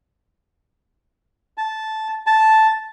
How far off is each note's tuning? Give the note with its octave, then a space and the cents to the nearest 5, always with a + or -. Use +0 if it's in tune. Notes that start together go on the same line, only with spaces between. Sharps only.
A5 -10
A5 -5